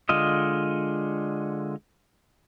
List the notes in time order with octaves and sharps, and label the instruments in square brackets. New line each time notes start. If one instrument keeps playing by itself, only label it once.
[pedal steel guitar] D3 G#3 F4 D#5